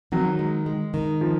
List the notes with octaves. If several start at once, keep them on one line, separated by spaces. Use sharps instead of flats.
D#3 F#3
G#3
G#3
D#3
F3